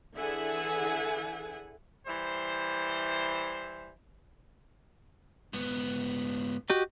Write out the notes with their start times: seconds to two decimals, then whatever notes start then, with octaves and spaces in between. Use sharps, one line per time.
0.15 D3 E3 G#4 E5 F#5 G#5
2.07 E3 G3 E4 C5
5.53 G#2 B3
6.70 F#4 G4 D#5